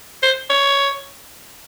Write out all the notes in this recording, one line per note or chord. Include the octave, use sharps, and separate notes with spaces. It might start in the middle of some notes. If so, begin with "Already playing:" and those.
C5
C#5